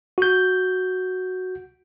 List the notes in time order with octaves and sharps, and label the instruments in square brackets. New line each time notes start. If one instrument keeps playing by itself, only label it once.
[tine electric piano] F#4 G6